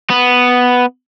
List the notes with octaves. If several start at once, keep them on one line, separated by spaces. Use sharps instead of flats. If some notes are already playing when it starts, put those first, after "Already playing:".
B3